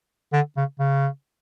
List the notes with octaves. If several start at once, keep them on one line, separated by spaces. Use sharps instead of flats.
D3
C#3
C#3